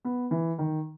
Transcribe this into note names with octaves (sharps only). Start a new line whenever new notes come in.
B3
E3
D#3